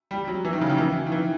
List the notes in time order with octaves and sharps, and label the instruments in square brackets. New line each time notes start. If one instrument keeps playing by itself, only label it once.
[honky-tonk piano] G3
F#3
E3
D#3
C#3
D#3
E3
D#3
E3